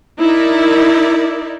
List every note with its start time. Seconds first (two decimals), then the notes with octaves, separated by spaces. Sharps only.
0.19 D#4 E4 A#4 D5